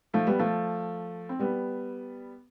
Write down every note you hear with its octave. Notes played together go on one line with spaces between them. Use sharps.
F3 A3
G3 B3
F3 A3
C4
G3 B3